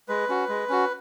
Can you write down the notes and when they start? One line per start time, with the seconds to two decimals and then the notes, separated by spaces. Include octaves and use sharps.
0.08 G#3 B4
0.29 C#4 F#4
0.48 G#3
0.69 C#4 F#4